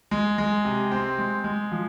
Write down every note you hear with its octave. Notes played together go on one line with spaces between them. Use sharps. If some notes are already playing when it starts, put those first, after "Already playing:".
G#3
G#3
C3
C4
G#3
G#3
F3